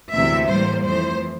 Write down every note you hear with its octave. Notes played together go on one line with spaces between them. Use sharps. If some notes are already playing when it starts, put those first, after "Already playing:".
D2 C3 E3 A#3 E5
A2 E3 G3 A#3 C5
F2 E3 A3 C5